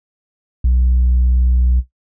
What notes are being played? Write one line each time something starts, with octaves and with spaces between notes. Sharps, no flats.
B1